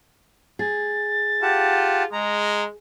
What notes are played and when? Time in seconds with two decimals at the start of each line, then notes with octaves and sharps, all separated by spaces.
0.59 G#4 A6
1.42 F4 G4 F#5 A5
2.13 G#3 A#5